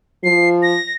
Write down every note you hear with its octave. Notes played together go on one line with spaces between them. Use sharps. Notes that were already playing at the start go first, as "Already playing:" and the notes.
F3 C7
A#6